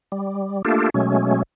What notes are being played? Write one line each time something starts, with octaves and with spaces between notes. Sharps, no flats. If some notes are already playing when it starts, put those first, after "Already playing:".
G3
A3 A#3 D4 F4 G4 A4
B2 F#3 G#3 A3 C#4